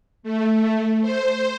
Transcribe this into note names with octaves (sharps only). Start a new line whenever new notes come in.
A3
C5